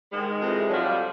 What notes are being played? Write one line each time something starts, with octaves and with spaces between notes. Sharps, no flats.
G#2 D#3 G#3
F2 C3 E3
G3
F2 D3 F3 F#3
G3